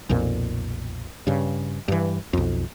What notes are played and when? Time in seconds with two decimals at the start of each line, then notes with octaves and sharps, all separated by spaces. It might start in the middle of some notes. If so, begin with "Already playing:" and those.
0.09 B1 F2 A#2
1.27 G2 C#3
1.88 G2 E3
2.33 B1 F2